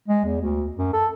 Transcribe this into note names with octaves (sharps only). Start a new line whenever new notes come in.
G#3
E2
D2
F#2
A4